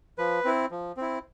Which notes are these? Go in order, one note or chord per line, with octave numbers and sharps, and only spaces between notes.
F3 B4
C4 E4
F3
C4 E4